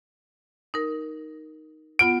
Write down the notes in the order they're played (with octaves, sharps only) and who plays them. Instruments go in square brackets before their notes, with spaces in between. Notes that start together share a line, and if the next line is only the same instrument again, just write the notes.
[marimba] D#4 A#4
[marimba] B3 F4 F#5 [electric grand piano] D7